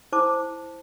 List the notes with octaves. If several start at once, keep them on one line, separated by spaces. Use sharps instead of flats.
E4 C5 A5 D6